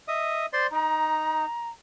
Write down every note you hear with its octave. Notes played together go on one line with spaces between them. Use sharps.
D#5 E5 D#6
C5 D5 C6
D#4 A#5